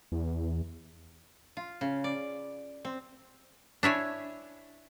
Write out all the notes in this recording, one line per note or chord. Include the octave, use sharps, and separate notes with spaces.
E2
F4
C#3
D5
C4
D4 E4 C#5 G#5